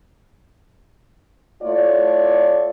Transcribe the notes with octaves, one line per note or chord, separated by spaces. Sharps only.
A3 E4 F4 C#5 D5